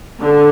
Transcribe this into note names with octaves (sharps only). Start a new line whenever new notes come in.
D3